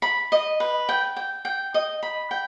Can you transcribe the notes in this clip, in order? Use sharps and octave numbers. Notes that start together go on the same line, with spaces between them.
B5
D#5
B4
G5
G5
G5
D#5
B5
G5